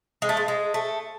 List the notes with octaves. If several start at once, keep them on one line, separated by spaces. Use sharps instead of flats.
G#3
A3
G#3
G#3
A3